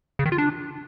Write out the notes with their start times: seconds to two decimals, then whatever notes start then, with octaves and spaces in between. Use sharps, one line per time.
0.19 C#3
0.26 D#3
0.32 F4
0.38 D4